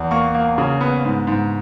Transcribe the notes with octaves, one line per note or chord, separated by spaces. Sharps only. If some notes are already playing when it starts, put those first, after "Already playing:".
Already playing: E2
A#3 C#6
A#3
C#3
B3
G#2
G#2